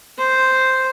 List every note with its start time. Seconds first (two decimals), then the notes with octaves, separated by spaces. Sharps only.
0.18 C5